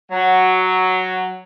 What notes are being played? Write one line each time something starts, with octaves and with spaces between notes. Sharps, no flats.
F#3